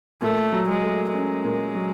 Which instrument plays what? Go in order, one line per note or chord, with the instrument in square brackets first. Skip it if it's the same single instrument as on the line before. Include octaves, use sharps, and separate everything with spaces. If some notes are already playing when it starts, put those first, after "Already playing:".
[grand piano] A#2 [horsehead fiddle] A3
[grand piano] F#3
[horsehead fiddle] G#3
[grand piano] A3
[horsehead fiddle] G#3 [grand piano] C#4
[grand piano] A#2
F#3